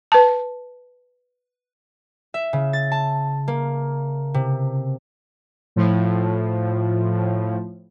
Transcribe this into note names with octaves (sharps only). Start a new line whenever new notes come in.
B4 A5
E5
C#3
A6
A5
A#3
C3
A2 F3